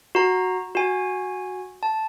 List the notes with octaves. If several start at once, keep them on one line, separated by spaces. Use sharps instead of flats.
F#4 A#5
F#4 G#5
A5